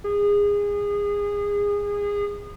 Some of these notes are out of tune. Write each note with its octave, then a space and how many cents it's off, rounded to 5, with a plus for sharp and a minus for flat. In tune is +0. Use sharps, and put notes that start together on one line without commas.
G#4 -25